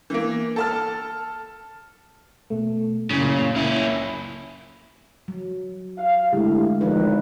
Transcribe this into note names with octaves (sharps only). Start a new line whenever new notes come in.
E3 A#3
A4 A5 F6
B2 A3
F#1 F#2 A#2 C#3 E4 G#5
C#2 C#4 E4
F#3
F5
D3 G#3 A3 E4 G4
G#1 F3 D#4 B4